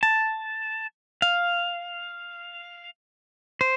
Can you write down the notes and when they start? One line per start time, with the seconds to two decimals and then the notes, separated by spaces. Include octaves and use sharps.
0.03 A5
1.22 F5
3.61 C5